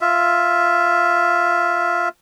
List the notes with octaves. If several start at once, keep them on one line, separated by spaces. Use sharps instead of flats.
F4 E5